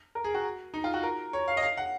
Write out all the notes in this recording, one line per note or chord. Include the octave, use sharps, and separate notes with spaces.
A#4
G#4
F#4
D#4
F4
F#4
A#4
C#5
F5
D#5
F5
F#5